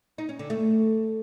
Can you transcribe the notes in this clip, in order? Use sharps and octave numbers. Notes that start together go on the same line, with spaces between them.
D#4
C#4
D3
A3